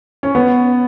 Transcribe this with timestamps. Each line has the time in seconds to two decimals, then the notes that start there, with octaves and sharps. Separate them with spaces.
0.23 C#4
0.35 B3